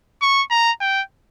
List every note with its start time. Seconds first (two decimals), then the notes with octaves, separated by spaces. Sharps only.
0.22 C#6
0.51 A#5
0.81 G5